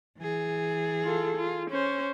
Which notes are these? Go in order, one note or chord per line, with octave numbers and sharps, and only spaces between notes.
E3 G#4
F4 A4
F4
C#4 C5